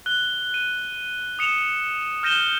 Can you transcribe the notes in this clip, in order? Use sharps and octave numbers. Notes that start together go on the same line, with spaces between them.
F#6 G7
D#7
D#6 C#7 E7 F7
F6 G6 A#6 D#7 E7 G7